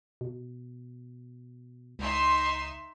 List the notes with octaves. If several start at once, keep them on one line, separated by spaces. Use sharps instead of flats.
B2
C#2 D#4 E5 C6